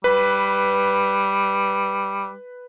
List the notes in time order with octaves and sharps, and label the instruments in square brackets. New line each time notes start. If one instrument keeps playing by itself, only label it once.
[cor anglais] G3 [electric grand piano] B4